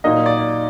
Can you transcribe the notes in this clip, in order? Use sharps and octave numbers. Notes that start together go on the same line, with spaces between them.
A#2 F#3 A#3 D#4 D#5
D5